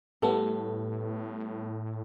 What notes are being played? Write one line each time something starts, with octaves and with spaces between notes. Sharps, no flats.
A2 G3 A3 B3 A4 A5